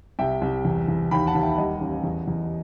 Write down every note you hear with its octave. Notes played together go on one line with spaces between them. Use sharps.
C2 E5 G5
C2
E2
E2
D#2 G5 B5
F#5 A5
D#2
E5 G5
G3 D#5 F#5
A1
E2
E2